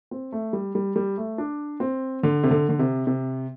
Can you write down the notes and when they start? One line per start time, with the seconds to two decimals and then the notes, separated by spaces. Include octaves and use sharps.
0.11 C4
0.32 A3
0.53 G3
0.75 G3
0.96 G3
1.17 A3
1.38 D4
1.80 C4
2.23 D3
2.43 C3
2.51 D3
2.69 D3
2.79 C3
3.07 C3